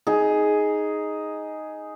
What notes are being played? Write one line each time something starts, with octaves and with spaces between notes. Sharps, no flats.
D#4 G#4